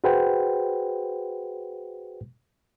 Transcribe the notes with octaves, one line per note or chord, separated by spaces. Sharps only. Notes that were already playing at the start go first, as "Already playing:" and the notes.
F#4 G#4 B4 C5 F#5 G5